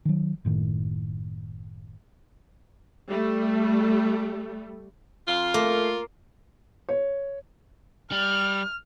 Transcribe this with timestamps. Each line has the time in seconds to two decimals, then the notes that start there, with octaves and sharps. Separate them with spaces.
0.05 D#3 F#3
0.45 F#1 A2 D#3
3.09 G3 A3
5.28 F2 F4 F5
5.54 A3 A#3
6.89 C#5
8.12 G3 F6